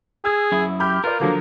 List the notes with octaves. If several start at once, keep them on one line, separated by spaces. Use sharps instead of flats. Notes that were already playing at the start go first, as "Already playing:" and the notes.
G#4 D#6 E6 G#6
F#2 E4
G4 B5 F6 G6
F4 A#4 B4 D5
D3 F3 F#3 A#3